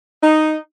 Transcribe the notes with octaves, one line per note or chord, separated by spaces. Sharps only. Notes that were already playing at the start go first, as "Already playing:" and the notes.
D#4